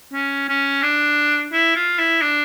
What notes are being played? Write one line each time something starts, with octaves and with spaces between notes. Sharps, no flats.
C#4
C#4
D4
E4
F4
E4
D4